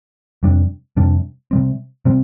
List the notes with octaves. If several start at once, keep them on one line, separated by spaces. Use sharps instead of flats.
F2 C3 G3 D4
F2 C3 G3 D4
C3 G3 C4
C3 G3 C4